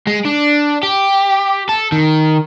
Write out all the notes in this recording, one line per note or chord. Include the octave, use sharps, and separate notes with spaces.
G#3
D4
G4
A4
D#3